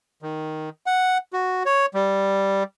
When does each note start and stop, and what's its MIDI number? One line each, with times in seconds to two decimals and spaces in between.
0.22 0.69 51
0.86 1.18 78
1.33 1.63 66
1.66 1.86 73
1.94 2.63 55